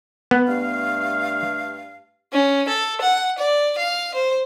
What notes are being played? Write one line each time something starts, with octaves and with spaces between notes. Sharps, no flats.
B3
G2 A3 F5
C#4
A4
F#5
D5
F5
C5